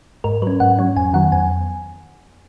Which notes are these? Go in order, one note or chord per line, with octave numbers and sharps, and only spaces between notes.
G#2 A#4
F#3 C#4 B4
G#2 F#5
F#3 C#4
F2 G#5
D#3 F#3 B3 F#5
F2 G#5